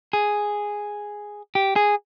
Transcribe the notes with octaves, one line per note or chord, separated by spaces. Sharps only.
G#4
G4
G#4